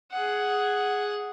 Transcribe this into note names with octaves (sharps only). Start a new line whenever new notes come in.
G#4 F#5